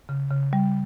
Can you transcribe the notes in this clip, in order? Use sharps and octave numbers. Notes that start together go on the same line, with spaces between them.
C#3
C#3
G3